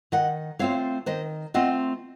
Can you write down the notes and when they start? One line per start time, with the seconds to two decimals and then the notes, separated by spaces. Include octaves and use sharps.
0.12 D#3 D#5 F#5
0.59 A3 C4 F4 C#5 F5
1.06 D#3 C5 D#5
1.54 A3 C4 F4 D#5 F#5